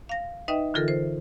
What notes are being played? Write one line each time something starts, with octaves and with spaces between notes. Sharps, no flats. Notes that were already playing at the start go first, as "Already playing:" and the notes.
F5 A#6
D#4 B4 D#5 E5 G5
D3 E3 F4 A4 A#4
C5